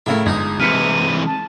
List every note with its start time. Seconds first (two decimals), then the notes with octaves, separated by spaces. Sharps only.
0.06 A2 C#3 A3 E4 A#4 E5
0.26 G1 G#3 D#4 F4
0.60 C3 E3 F6 B6 C#7 D#7
1.26 A5